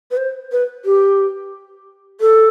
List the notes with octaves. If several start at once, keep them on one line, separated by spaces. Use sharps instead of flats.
B4
C5
B4
G4
A4